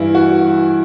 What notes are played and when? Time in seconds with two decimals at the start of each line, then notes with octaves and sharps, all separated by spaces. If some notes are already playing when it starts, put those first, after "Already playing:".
Already playing: G2 E3 E4
0.15 F#4